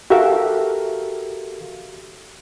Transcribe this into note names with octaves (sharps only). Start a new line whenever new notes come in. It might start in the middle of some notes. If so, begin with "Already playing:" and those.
F#4 G4 A4 A#4 E5 F5